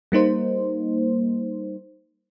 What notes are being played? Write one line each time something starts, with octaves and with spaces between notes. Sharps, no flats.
G3 A#3 D#4 C5